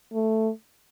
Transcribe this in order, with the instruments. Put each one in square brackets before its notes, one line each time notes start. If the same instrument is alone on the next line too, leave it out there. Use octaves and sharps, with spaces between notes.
[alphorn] A3